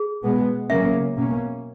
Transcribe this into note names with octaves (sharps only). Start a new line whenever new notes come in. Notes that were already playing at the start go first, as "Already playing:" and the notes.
Already playing: G#4
B2 G#3 B3
C#3 F#3 A#3 C#4 E5
B2 A#3 C#4